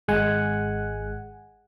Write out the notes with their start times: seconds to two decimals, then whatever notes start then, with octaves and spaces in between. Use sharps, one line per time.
0.08 G#1 G#3 F#5 G#5